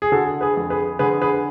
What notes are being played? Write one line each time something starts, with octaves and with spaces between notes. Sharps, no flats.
G#4
D3 F#4 A4
G#4 B4
F2
G#4 B4
D3 G#4 B4
G#4 B4